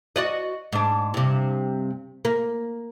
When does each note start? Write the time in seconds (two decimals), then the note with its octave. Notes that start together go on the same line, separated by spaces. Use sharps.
0.16 F#4 D5 D#5
0.72 G#2 D4
1.14 G2 C3
2.25 A#3